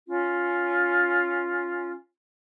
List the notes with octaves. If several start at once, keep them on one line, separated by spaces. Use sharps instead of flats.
C#4 F4